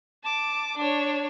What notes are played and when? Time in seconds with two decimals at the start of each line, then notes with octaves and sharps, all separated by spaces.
0.24 A5 D6
0.77 D4 C#5